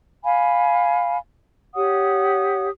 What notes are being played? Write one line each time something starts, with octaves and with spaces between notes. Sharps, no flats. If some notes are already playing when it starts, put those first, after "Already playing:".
F5 G#5 B5
G4 C#5 F#5 D#6